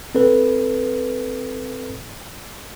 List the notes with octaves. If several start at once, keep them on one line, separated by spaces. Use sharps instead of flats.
C4 A4 B4